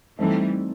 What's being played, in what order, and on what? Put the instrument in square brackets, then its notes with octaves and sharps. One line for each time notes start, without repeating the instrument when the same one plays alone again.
[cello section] E3 G3 [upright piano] A3 C4 D#4 A4